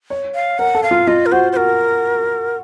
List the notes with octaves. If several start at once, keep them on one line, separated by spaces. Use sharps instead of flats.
C#5
F5
A#4 F#5
A4
F5
F4
F4 D#5
A#4
F#4 C5
C5
F#4 A#4